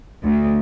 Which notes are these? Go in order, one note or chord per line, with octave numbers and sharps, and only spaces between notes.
D2